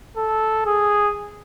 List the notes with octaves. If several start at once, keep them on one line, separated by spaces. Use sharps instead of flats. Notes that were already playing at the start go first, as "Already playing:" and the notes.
A4
G#4